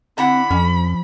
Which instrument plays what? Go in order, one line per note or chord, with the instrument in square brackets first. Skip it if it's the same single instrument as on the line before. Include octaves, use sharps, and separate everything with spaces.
[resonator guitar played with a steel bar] D3 E4 F#5 [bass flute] C4 [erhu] B5
[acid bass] F2 [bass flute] F3 [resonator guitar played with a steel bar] C#4